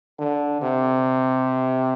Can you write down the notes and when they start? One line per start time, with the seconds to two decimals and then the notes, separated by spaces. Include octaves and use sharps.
0.19 D3
0.62 C3